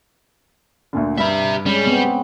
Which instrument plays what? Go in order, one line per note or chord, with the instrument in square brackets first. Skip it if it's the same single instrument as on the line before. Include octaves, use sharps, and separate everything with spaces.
[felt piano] D2 A#2 D3
[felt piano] G2 B5 [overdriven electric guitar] G4 E5
[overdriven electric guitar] G3 [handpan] G#3 C#4
[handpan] B3 C4